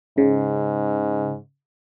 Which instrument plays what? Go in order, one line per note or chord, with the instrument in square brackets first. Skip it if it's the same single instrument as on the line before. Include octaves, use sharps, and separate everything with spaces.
[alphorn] G#2 [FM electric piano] C#3